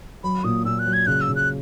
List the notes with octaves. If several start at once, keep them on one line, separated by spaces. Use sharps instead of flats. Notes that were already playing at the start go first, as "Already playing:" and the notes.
F#3 B5
A#2 D#6
A#2 E6
F#6
F#3
G#6
C#3 F#6
E6
C#3
F#6